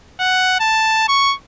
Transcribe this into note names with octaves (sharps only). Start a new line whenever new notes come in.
F#5
A5
C#6